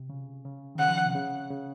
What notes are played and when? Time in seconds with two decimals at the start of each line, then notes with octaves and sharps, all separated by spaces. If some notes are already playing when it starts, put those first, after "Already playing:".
Already playing: C3
0.10 C#3
0.45 C#3
0.75 D#3
0.79 C#3 F#5
0.88 F3
1.06 C3
1.15 C#3
1.50 C#3